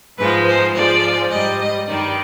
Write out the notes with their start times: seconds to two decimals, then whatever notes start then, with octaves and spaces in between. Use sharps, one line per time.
0.18 G#2 F3 G#3 B4
0.46 C5
0.75 G#2 F3 G#3 D5
1.30 G#2 G3 D#5
1.60 D#5
1.88 G2 D#3 G3 D5